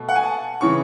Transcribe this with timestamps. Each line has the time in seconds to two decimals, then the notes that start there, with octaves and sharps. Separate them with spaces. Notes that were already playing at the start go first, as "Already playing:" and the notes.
Already playing: B2 A3
0.09 F#5
0.16 G#5
0.23 A5
0.61 C#3 E3 C#6